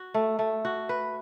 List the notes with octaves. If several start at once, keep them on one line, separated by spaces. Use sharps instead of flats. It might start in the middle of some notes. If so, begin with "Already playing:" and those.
Already playing: F#4
A3
A3
F#4
B4